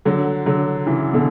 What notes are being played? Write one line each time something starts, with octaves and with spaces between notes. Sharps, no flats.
D3 F#3
D3 F#3
C#3 E3
B2 D3